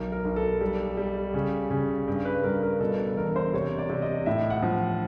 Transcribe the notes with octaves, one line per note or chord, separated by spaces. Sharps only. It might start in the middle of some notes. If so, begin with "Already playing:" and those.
Already playing: B1 A#4
A#4
B1
A4
G3
G3
C#3
C#3
G2
B4
G2 A#4
A#4
B2 A4
A4
E1 A#4
C5
C3 C#5
D5
C3
D#5
A2 E5
F#5
F3